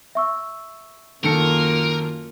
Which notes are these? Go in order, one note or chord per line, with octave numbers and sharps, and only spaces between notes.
E5 C#6 E6
F#2 D#3 A#3 F4 A4 A#4 C#7